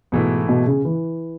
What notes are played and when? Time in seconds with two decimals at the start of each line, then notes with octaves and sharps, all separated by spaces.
0.12 G#2 B2 E3 A3 E4
0.49 B2
0.67 C#3
0.85 E3